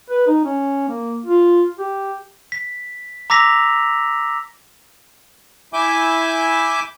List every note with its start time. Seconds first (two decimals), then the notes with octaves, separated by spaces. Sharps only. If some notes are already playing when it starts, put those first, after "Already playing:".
0.10 B4
0.28 D#4
0.45 C#4
0.89 A#3
1.26 F4
1.79 G4
2.52 B6
3.30 A#5 D6 E6 A#6 B6 F7
5.73 E4 E5 G#5 D6 G6